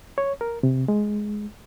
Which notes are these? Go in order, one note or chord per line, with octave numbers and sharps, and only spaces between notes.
C#5
A#4
C3
G#3